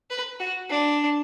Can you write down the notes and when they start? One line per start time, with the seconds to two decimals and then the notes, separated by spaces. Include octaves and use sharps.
0.10 B4
0.40 F#4
0.70 D4